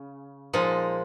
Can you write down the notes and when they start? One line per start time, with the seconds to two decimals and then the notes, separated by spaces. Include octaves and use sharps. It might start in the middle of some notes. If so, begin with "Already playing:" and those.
Already playing: C#3
0.53 A#2 F3 G#3 D#4